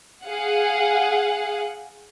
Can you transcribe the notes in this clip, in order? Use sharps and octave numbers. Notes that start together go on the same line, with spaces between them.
G#4 F5 F#5